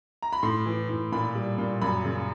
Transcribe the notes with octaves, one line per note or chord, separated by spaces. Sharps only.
A#5
B5
A2 C6
E3
A2
A#2 B5
G3
A#2
F#2 B5
C#3